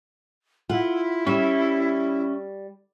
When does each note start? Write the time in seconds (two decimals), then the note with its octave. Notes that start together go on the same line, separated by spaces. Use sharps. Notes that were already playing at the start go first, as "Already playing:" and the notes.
0.69 E4 F4 F#5
1.27 G3 C#4 E5